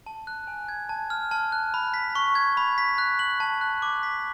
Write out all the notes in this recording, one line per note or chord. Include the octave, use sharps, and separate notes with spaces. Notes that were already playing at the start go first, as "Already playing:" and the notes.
A5
F#6
G#5
G#6
A5
F6
A5
F#6
B5
B6
C#6
G#6
B5
B6
F#6
F#7
A5
F#6
D6
B6